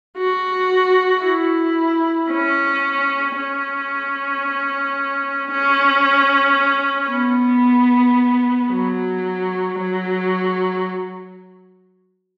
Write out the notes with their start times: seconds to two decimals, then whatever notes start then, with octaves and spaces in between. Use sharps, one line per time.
0.17 F#4
1.24 E4
2.31 C#4
3.38 C#4
5.51 C#4
7.12 B3
8.72 F#3
9.79 F#3